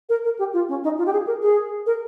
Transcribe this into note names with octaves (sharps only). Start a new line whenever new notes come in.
A#4
A#4
G4
F4
C#4
D#4
F4
G4
G#4
A#4
G#4
A#4